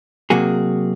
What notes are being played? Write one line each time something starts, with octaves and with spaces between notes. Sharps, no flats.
C3 F#3 A#3 F#4 G#4